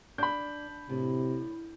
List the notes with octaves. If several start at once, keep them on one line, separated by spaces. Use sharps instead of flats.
D4 B5 G6
A2 C3